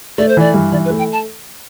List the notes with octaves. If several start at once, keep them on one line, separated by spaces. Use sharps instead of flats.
A3 D5
C5
E3 D5
G2
E3 D5
B4
A3
G5
A5